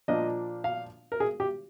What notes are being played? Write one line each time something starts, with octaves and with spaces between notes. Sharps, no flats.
A#2 F3 A#3 D4 D#5
F5
A#4
G#4
G4